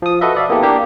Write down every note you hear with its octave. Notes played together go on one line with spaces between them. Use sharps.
F3 D#6
F#4 A4 B4 D#5 E5
D5 E5 F5
A#3 B3 E4 G4 A4
A#3 D4 G4